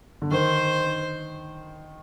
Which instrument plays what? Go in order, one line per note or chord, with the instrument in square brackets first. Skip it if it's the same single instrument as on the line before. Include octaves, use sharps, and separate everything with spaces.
[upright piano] D3
[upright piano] D#3 [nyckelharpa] C5